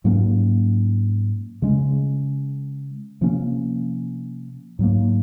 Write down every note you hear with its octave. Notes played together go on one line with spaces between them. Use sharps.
G#2 F#3 A#3 C#4
C#3 G#3 C#4
C3 F3 A#3 C#4
G#2 F#3 A#3